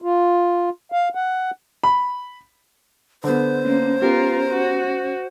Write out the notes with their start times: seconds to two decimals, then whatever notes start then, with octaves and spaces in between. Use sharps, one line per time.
0.02 F4
0.92 F5
1.15 F#5
1.84 B5
3.24 D3 B3 C5
3.65 A#3 C#4
4.01 B3 F4 G4 A#4
4.49 F#4